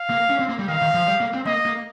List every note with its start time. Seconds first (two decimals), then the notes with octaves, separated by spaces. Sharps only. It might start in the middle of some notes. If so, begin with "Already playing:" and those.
Already playing: F5
0.10 A#3
0.30 C#4
0.39 C4
0.49 A#3
0.59 G3
0.68 D#3 F5
0.82 D#3
0.94 F3
1.08 G3
1.21 A#3
1.34 C4
1.46 A#3 D#5
1.66 A#3